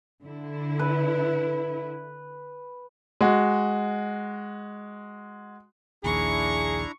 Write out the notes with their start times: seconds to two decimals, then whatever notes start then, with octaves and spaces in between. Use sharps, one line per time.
0.23 D3 E4
0.79 B4
3.21 G#3 F#4
6.04 A#1 D#2 D4 E4 G#4 A#5 C#6